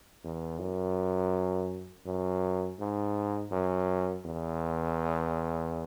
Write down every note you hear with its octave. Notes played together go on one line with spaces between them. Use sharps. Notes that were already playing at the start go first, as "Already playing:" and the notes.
E2
F#2
F#2
G#2
F#2
E2